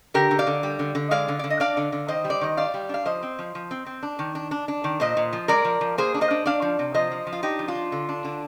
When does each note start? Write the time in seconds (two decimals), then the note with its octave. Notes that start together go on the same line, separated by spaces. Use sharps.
0.14 D3 G4 A#4
0.31 D3
0.39 D5 F5
0.47 D3
0.63 G3
0.79 D3
0.95 D3
1.11 G#3 D5 F5
1.28 D3
1.39 D3 D5
1.50 D#5
1.60 D4 D5 F5
1.77 D3
1.92 D3
2.08 D#3 C5 D#5
2.24 G3
2.30 D5
2.41 D#3 D#5
2.57 G3 D5 F5
2.74 G3
2.89 D4 F5
3.05 F3 C5 D#5
3.23 C4
3.39 F3
3.55 F3
3.71 C4
3.86 C4
4.03 D4
4.19 D#3
4.35 D4
4.51 D4
4.68 D4
4.84 D#3
5.00 A#2 C5 D#5
5.17 A#2
5.33 F3
5.48 G#3 A#4 D5
5.65 F3
5.81 F3
5.98 A#3 G#4 C5
6.14 D4
6.21 C5 D#5
6.31 D4
6.46 D4 D5 F5
6.62 F3
6.79 C3
6.94 F3 C5 D#5
7.11 F3
7.27 F3
7.33 F4
7.43 D4 D#4 G4
7.59 F3
7.68 D4 F4
7.75 F3
7.92 D3
8.09 D4
8.25 D3